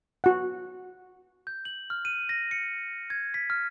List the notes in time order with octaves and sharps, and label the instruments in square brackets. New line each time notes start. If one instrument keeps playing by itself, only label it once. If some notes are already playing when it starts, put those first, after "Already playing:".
[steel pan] F#4 F#5
[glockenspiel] G6
F#7
F6
D#7
A#6
C#7
G#6
B6
F6